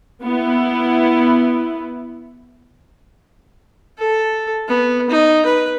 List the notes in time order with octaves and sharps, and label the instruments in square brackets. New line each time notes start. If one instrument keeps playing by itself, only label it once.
[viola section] B3 E4
[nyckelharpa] A4
B3
D#4
B4